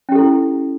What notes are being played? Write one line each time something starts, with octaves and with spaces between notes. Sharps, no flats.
C#4 E4 G4 A4